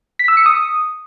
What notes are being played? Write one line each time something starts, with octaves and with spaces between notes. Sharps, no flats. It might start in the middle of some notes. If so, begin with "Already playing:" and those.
B6
E6
C#7
D#6